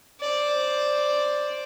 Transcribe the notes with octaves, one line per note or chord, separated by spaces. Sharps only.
C5 D5